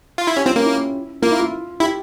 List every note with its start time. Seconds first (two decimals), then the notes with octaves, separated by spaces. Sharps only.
0.18 F4
0.27 E4
0.36 C#4 G4
0.46 C4 F4
0.55 A#3 C#4
0.65 E4
1.22 A#3 F4
1.31 E4
1.39 F4
1.80 E4 G4